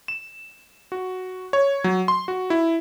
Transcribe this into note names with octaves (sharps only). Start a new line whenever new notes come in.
E7
F#4
C#5
F#3
C6
F#4
E4